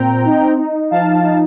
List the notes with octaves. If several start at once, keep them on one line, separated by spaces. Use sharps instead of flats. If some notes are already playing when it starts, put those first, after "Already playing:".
Already playing: A#2 C4 G5 A#5
D#4
D#4
F3 F5 A5
D#4